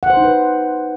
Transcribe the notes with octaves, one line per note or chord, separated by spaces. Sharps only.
F#5
C5
D#4
B4